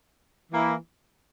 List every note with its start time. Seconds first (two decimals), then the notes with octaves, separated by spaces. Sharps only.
0.51 E3 A#3 E4